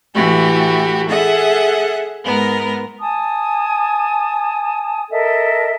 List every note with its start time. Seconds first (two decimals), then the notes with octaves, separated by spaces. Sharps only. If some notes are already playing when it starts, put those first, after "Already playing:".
0.15 A2 E3 A3 F#4 G4 B5
1.08 G#4 A4 E5 F#5
2.23 G#2 B3 A#4
3.00 G#5 A5 D#6
5.11 A4 A#4 D#5 E5